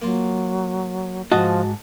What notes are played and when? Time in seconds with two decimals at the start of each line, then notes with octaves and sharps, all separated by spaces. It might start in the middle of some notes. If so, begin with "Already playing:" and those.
0.02 F#3 A#3 F4
1.32 G#2 F3 F#4 D#5 A5